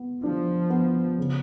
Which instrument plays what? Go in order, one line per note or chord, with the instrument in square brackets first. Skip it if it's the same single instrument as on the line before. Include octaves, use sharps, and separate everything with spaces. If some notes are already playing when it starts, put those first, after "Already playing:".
Already playing: [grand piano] B3
[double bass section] F3 [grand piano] D4
[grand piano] B3
C#3